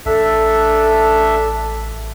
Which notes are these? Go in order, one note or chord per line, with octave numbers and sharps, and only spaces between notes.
A1 D4 A4 E5